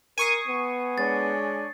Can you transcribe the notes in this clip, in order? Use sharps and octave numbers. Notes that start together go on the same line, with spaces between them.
A#4 G#5 C#6 D#6 C7 D#7
B3
G#3 D4 C#5 A6